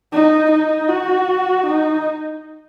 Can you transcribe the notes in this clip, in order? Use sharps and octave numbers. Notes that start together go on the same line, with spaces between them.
D#4
D#4
F#4
D#4